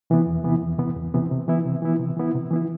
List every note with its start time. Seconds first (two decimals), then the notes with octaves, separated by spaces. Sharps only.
0.10 C3 E3 B3
0.27 E2
0.44 C3 E3 B3
0.61 E2
0.78 C3 E3 B3
0.97 E2
1.14 C3 E3 B3
1.31 C3
1.48 E3 B3 E4
1.65 C3
1.82 E3 B3 E4
1.99 C3
2.17 E3 B3 E4
2.35 C3
2.51 E3 B3 E4